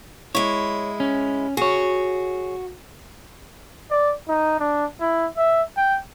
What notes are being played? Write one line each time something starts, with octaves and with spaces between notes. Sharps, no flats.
G#3 E4 C#5
C#4
F#4 G#4 C#5
D5
D#4
D4
E4
E5
G5